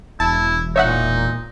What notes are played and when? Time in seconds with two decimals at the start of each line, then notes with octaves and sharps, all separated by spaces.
0.20 E1 E4 A5
0.76 A#2 D#4 C#5 E5 F#5